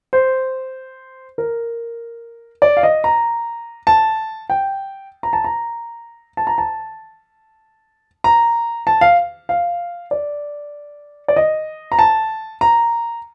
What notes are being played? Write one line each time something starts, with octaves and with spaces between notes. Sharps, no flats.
C5
A#4
D5
F5
D#5
A#5
A5
G5
A#5
A5
A#5
A5
A#5
A5
A#5
A5
F5
F5
D5
D5
D#5
A#5
A5
A#5